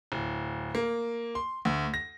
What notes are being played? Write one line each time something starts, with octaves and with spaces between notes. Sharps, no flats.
D1
A#3
C6
D2
A#6